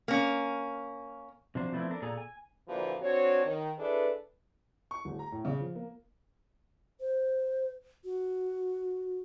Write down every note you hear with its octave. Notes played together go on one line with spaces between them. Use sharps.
A#3 C#4
C3 F3 F#3 D4 C5
F3 A3 B3 C4 D4 E4
D4 A4 A#4
A#2 G#4 A4 D5 G#5 A#5
G#5
A#2 D3 E3 F3 A#3 F#4
C4 D4 F#4 C#5
D#3
D4 E4 G#4 A4 B4
C#6
D1
A#5
A2
C#3
F3
A#3
C5
F#4